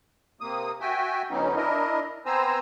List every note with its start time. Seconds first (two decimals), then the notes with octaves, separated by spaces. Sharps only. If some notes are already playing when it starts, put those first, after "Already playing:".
0.41 C3 A#3 D#6
0.81 F#4 E5 G5 G#5
1.31 D2 E3 F#3 B3 C#4 D#4
1.56 D4 E4 A#4 D#5
2.26 B3 C4 C5 G#5 A#5 E6